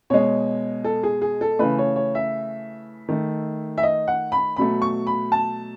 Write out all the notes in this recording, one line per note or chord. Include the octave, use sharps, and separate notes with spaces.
B2 G#3 C#5
A4
G#4
G#4
A4
C#3 E3 A3 B4
C#5
C#5
E5
D#3 A3
E5
D#5
F#5
B5
B2 F#3 A3 B5
C#6
B5
A5